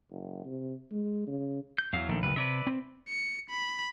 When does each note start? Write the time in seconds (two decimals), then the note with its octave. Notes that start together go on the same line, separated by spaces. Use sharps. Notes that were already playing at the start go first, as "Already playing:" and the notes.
0.10 F#1
0.45 C3
0.91 G#3
1.27 C#3
1.78 G6
1.93 E2 F#3 F5
2.09 A#1 D#3 A3
2.23 F#1 D2 B4
2.36 C3 B4 D5 E5
2.67 C4
3.09 C#7
3.50 B5